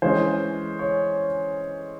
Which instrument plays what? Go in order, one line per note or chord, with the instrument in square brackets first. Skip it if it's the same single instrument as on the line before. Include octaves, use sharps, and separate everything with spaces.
[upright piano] E3 G#3 C#4 C5
C#5